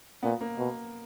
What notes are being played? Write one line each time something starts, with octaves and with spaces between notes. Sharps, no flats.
A#2 B3
A#3
B2